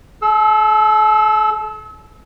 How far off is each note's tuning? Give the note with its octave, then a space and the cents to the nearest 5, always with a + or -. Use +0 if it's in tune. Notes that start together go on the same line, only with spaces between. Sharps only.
A4 -40 E6 +0